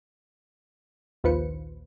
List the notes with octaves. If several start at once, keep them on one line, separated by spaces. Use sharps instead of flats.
A#1 D#2 F4 B4 C5 C#7